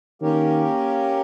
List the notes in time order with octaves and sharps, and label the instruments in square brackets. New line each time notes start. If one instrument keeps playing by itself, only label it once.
[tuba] D#3 [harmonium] A#3 C#4 G4 A#4 C#5